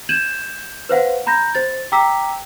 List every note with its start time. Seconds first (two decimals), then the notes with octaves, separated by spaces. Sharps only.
0.09 G6 G#6 D#7 E7 F#7
0.89 B4 C5 F5 F#5
1.27 A#5 B5 G6 A#6
1.55 C5 A6
1.92 G5 A#5 D6 E6 B6